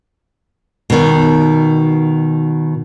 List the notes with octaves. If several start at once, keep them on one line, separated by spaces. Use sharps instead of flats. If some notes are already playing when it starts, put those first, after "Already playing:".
B2 D#3